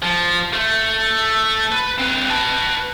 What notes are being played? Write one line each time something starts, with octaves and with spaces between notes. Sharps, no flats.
F3
A3
B4
C4 B4
B4 A5